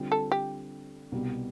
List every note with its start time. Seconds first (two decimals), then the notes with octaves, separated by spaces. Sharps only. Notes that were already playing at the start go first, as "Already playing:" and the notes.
Already playing: D3 G3 C4 F4
0.12 A4
0.32 G4
1.12 C2 B2 G3 B3